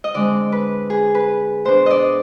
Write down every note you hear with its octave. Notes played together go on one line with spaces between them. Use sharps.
D#5
D3 G#3 C4 D5
B4
G#4
B4
B2 B3 D4 C5
D5 D#5